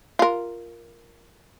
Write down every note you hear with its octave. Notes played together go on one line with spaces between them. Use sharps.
F4 A#4